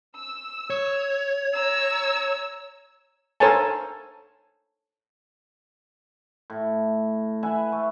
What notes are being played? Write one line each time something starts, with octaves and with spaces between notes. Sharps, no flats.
E6
C#5
A#5 E6
A4 A#4 C5 C#5 G#5 A5
A2
B4 E5 F#5 G#5
A3